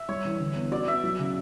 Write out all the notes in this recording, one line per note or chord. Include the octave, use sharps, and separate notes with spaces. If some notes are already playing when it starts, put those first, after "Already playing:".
Already playing: E5
G3 C#5
E3
D3
B3
F#4 D5
B3 E5
F#3
C#3